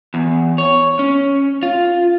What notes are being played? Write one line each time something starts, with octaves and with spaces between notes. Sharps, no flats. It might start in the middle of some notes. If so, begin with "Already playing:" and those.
E2
C#5
C#4
F4